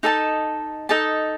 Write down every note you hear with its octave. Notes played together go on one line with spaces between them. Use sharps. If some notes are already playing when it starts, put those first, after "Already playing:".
D#4 A4 D#5 A5
D#4 A4 D#5 A5